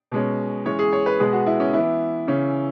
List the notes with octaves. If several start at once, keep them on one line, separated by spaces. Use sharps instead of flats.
B2 G#3 C#4
E3 G#3 C#4 C#5
G#4
C#5
B4
B2 G#3 B3 G#4
F#4
E4
C#4
E3 B3 E4
C#3 E3 C#4